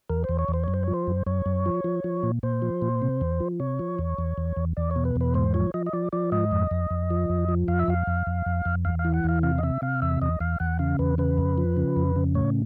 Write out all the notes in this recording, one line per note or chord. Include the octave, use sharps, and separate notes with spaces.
E2 A#4
E2 C5
C#5
E2
C5
F#2 C#5
C5
F3 C#5
C5
F#2
F#2 C#5
F#2
F3
F3
F3
A#2
A#2 C5
F3
A#2
C3
E2
F3
C3 C#5
F3
E2
E2
E2
E2
E2 D5
C#5
B2
B4
E2
B4
G#2 C5
F3 C#5
F3 D#5
D#5
F3 D5
F3 D5
G#2 D#5
F2
F2
F2
F3
F2
F3
F2 F5
E5
F2 F5
F2
F2
F2
F2
E2 F5
F5
E3
F#5
E2 F5
C3 F5
D#5
C3 E5
C3 F5
E2 E5
E2 D#5
E2 F5
E2 F#5
C#3 F5
E2 B4
C#3 B4
F2
F3
C#3
F2
C#3
A2 C#5